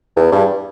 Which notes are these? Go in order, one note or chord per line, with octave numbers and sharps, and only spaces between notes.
E2
G2